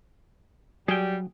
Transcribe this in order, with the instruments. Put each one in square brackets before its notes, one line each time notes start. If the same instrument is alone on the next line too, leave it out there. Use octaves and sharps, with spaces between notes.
[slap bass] F#3 [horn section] G3 [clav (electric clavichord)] G#4 G5